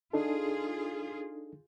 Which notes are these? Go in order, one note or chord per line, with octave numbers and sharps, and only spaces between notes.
D4 D#4 F4 G#4 A4